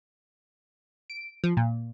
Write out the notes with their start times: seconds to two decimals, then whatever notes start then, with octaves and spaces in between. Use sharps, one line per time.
1.10 D7
1.44 F3
1.57 A#2